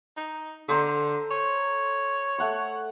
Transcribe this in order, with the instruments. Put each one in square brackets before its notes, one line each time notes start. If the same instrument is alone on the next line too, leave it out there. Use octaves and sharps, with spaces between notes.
[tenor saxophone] D#4
[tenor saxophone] D3 [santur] A4 C5 A#5
[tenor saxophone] C#5
[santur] A3 F#5 C#6